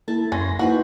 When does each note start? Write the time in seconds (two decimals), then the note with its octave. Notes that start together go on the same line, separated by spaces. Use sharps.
0.08 A#3 E4 A4 A5
0.32 F#2 C#4 C6 A#6
0.59 A#3 D#4 E4 F#4 B4 C5